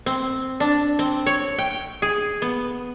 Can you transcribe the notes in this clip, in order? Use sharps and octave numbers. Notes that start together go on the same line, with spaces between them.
C4
D4
C4
C#5
G5
G#4
B3